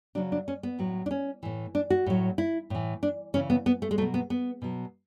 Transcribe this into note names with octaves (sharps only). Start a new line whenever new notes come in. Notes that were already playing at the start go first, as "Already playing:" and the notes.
C#3 F#3 D4
D4
C#4
B3
A2 F#3
D4
C#4
A2 E3
D4
F#4
A2 F#3
E4
A2 E3
D4
C#3 E3 C#4
B3
B3
A3
G#3
B2 F#3 A3
B3
B3
B2 F#3